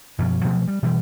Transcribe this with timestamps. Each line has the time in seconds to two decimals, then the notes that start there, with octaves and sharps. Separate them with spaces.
0.19 F#2 B2 F3 F#3
0.44 B2 F3 F#3 A3
0.68 G3
0.83 B2 E3 G3